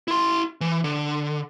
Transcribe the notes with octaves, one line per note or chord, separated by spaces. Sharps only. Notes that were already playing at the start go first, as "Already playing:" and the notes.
E4 C6
E3
D3